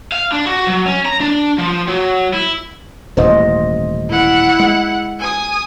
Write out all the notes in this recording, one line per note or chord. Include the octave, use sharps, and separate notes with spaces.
F5
D4
F#4
F#3
C#4
A#5
D4
F3
F#3
E4
D#1 A1 G#2 C5 D#5
E4 F#5
G#3
G#5 D#6